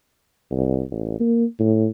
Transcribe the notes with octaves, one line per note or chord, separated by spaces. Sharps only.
C2
A1
A#3
A2